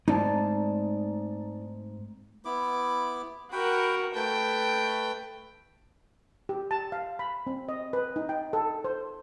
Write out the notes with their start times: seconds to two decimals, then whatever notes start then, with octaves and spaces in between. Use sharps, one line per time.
0.08 G#2 G#3 A3 C4 D#4 D5 A5
2.45 B3 E4 D6
3.52 F#4 A#4 F#5 G5 B5
4.15 A3 B4 G5 A5
6.49 G4
6.71 A5
6.92 F5
7.19 B5
7.47 C4
7.69 D#5
7.93 B4
8.16 D#4
8.29 G5
8.53 A4
8.84 C5